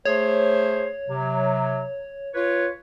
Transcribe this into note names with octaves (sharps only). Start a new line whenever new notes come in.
A3 G#4 C5 C#5
C3 F#3
F4 B4 C#5